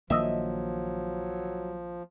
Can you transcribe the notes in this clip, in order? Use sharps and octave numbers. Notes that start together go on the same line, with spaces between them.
A#1 D#3 F3 F#3 A#3 D#5 E5